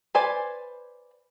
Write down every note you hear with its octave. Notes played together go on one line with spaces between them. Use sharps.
B4 C5 D5 G#5